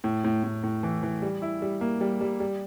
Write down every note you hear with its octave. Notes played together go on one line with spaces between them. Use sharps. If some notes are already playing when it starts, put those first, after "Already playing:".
A2
A2
A2
A2
E3
E3
G3
E4
G3
A#3
G3
G3
G3